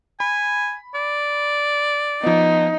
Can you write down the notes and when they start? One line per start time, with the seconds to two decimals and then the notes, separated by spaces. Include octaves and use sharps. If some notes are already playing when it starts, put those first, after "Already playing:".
0.20 G#5 B5
0.94 D5
2.23 F3 B3 D#4